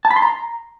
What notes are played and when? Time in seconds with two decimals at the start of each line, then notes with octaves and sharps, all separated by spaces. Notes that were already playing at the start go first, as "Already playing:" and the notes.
0.05 A5
0.11 B5
0.16 C6
0.22 A#5